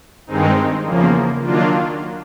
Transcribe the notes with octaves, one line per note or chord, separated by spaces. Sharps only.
G2 D#3 G#3 C4 D#4
E2 C#3 F3 A#3
D#3 F#3 A#3 D4 F4